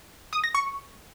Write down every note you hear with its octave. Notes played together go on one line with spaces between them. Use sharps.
D#6
A#6
C#6